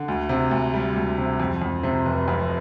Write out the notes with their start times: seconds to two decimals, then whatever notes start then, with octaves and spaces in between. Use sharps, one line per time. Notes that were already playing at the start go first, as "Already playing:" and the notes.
Already playing: D3
0.08 D2
0.29 C3
0.51 D2
0.74 G3
0.96 D2
1.18 C3
1.40 F2
1.62 F2
1.83 C3
2.06 F1
2.28 F2